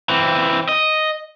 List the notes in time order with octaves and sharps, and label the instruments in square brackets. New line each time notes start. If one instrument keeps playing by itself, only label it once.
[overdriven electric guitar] E3 C4
D#5